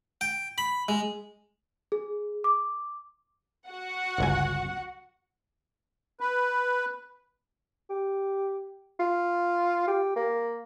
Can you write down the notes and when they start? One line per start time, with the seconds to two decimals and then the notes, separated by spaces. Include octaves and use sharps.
0.21 G5
0.58 B5
0.88 G#3
1.92 G#4
2.44 D6
3.67 F#4 F#5
4.18 G1 C#2 G#5
6.20 B4
7.90 G4
9.00 F4
9.87 G4
10.16 A#3